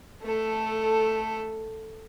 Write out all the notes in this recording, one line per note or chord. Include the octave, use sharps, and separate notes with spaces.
A3 A4